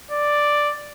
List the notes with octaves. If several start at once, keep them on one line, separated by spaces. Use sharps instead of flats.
D5